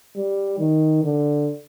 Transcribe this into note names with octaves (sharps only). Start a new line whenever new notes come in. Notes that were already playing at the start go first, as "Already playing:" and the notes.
G3
D#3
D3